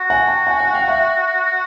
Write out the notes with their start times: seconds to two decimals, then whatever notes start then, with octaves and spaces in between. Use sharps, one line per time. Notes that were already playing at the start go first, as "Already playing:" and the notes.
Already playing: F#4
0.10 F#5 G#5
0.28 G5 A5
0.47 F#5 G#5
0.60 F#5 G#5
0.74 F5 G5
0.88 E5 F#5